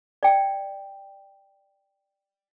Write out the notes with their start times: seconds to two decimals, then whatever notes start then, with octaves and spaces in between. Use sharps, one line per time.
0.23 D5 G5